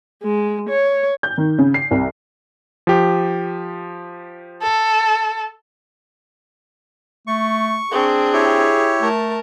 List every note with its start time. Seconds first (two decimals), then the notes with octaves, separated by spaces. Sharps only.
0.23 G#3
0.70 C#5
1.23 G6
1.38 D#3
1.58 C#3
1.74 C7
1.91 C2
2.87 F3 G4
4.63 A4
7.27 A3 C#6
7.91 C4 D4 G#4
8.33 E4 G4 C#5
9.02 A3 A#4 A5